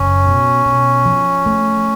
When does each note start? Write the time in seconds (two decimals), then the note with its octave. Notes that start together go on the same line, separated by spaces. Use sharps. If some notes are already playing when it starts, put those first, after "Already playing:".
Already playing: F#1 C#4
0.26 B2
0.66 B2
1.05 F3
1.46 A3